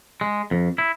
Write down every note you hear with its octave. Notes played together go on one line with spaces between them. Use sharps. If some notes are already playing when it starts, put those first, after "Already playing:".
G#3
F2
E4